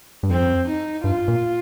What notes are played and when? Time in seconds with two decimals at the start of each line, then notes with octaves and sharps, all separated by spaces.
0.23 G2
0.30 F2 C4
0.67 D#4
1.04 G2 F4
1.28 A#2